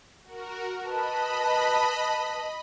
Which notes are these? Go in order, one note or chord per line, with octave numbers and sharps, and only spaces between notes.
F#4 A#4
B4 D#5 A5 B5